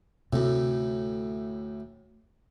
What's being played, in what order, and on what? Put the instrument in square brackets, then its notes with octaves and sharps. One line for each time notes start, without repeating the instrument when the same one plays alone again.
[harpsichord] D2 A2 [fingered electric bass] C3